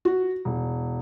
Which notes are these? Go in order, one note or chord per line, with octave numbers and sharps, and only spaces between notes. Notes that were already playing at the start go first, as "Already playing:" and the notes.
F#4
E1